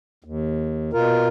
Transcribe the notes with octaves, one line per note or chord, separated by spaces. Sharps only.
D#2
B2 F4 A#4